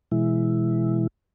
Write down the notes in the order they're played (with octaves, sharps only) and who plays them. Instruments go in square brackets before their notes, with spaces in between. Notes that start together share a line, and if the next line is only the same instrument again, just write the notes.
[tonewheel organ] B2 E3 G#3 E4